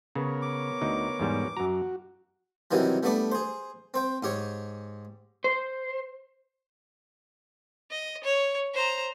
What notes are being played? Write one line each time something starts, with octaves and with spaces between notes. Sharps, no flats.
C#3 B3 A#4 C#5
D6
D2 D#4
E2 G#2 G3
F#2 F#4 A#5
C3 D#3 E3 F#3 G3
G3 A3 B3 D4 D5
G#4 C5
C4 C5 G5
G#2 G4 C#5
C5
D#5
C#5
C5 A#5